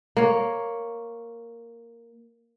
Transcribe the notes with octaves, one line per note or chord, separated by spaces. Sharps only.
A#3 C#5